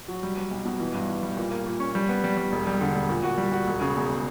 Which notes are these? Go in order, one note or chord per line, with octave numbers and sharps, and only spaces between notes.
F#3
G3
G3
B1
B2
E3
G2
E3
G3
A#2
A#3
A#2
C#4
G3
B3
G3
G3
E1
G3
D3
E1
A#2
F#4
G3
F#4
E1
C#3
E2